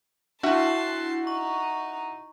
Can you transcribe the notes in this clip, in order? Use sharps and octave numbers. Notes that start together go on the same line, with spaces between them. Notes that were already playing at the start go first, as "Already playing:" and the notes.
D4 E4 F#4 E5 F#5 A5 C6
D#4 C#6